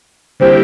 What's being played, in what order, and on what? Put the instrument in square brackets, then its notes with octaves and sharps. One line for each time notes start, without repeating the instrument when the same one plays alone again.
[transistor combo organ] D3 G3 A#3 E4 G4 [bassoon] C4